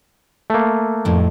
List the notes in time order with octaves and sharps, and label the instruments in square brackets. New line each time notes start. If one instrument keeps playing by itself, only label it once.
[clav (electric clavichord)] A3 A#3
[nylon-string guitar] F2 A2